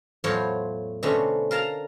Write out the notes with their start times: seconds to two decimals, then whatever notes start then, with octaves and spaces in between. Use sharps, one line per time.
0.24 E2 A2 F#3 F4 C5 C#5
1.03 B2 D3 A3 C4 C#4
1.51 A#4 F5 A5 A#5